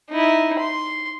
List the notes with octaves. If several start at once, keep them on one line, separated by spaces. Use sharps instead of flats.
D#4 E4
C6